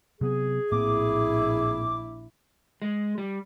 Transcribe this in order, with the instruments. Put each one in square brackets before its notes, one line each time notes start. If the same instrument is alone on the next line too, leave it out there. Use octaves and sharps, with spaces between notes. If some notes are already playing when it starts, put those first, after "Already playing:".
[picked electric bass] C3 F#3 B3 [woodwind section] G#4
[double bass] A#1 E4 [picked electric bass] A2 A#3 C4 [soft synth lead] D6
[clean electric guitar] G#3
G3